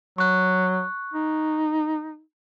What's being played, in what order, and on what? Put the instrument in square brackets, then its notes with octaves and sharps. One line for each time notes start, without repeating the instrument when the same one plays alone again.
[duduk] F#3 [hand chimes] C#6 F#6
[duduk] D#4